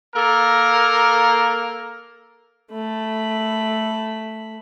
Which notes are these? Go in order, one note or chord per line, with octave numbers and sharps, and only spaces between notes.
A#3 A4 A#4
A3 B5